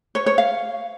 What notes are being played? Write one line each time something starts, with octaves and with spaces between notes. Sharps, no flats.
C#5
C#5
F5